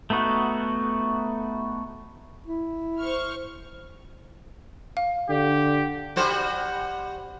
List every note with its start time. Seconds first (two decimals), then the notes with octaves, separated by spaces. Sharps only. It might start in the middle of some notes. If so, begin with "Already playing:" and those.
0.10 A3 B3 D#4 F#4
2.46 E4
2.99 C5 C#6 F6
4.97 F5
5.29 D3 G4
6.16 G3 F#4 C5